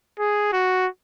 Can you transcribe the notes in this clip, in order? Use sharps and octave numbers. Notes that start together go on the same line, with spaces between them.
G#4
F#4